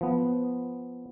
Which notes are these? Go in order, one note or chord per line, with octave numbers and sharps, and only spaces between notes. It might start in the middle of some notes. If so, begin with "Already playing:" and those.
F3 B3